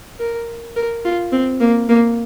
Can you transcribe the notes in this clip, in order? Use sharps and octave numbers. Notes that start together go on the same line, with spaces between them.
A#4
A#4
F4
C4
A#3
A#3